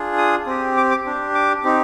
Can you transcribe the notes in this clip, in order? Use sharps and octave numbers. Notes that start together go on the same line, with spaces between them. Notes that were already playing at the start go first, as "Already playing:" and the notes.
Already playing: D4 F4 G#4
D#6
C4 G4
D6
D6
D4 G4
D6
C4 D#4 G4